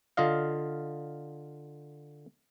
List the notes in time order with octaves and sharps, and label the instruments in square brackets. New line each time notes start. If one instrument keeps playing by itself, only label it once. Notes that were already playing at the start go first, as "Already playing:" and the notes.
[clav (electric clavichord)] D3 F4 D#5 F5